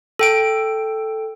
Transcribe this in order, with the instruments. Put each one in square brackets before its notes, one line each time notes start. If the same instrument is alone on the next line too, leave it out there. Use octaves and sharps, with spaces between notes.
[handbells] A4 G5 D7